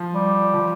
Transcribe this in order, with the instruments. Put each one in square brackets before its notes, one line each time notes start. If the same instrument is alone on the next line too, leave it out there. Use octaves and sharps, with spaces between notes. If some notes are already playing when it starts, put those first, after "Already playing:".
Already playing: [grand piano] F3
[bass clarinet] G3
[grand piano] F3